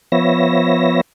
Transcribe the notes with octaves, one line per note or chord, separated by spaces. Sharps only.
F3 B3 C#5 E5 A#6